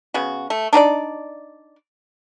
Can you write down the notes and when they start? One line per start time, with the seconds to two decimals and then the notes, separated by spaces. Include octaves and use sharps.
0.14 C#3 B3 F#4
0.50 A3
0.73 D4 D#4 F#4 D5